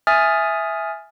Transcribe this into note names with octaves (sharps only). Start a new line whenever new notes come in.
E5 G#5 D#6 F6 A6